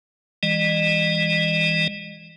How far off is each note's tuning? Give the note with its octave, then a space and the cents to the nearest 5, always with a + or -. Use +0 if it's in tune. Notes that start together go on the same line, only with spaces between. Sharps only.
E3 +0 G#3 -30 D#5 -35